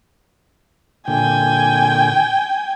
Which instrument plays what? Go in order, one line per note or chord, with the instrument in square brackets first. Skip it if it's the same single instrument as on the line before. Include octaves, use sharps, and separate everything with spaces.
[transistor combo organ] A#2 D3 [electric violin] G5 G#5